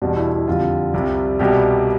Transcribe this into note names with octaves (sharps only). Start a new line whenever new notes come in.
E2 B2 G3 D4
E4
E4
F2 D3 G3 F4
C2 C3 G3
C2 B2 G3 G4